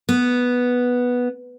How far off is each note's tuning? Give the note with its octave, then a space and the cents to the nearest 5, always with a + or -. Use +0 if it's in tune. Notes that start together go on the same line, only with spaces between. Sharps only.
B3 -5